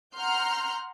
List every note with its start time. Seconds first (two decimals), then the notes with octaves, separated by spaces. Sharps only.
0.16 F#5 A#5 C6 F6 G6